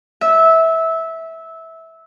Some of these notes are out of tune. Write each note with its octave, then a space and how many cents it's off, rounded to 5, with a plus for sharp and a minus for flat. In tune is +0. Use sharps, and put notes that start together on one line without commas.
E5 -15